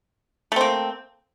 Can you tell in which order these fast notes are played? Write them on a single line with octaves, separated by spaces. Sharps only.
A3 C4 A#3